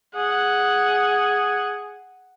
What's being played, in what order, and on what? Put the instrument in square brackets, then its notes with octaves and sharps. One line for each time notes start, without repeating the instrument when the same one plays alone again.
[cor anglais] G#4 [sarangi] F#5